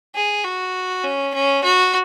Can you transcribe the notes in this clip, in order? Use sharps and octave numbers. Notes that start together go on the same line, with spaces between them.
G#4
F#4
C#4
C#4
F#4